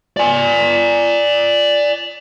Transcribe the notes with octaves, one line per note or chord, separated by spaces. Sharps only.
D5 G#5